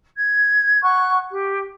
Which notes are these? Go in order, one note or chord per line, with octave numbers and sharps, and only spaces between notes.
G#6
F#5 C#6 F#6
G4